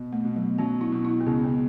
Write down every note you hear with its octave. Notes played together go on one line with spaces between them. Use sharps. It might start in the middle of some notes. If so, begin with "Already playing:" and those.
Already playing: B2
A3
B2
F#3
F#3 C#4
E4
B2
E4
B3
C#2 C#4
B3